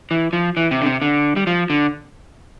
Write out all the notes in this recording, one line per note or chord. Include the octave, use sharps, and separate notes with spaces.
E3
F3
E3
C3
D3
C3
D3
G3
F3
D3